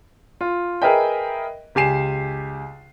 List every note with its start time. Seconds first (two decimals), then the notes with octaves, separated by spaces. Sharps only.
0.41 F4
0.82 G#4 A#4 B4 D#5 E5 G5
1.75 C#2 G4 G#5 C7 E7